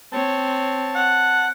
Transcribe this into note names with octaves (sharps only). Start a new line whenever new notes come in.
C4 C#5 A5
F#5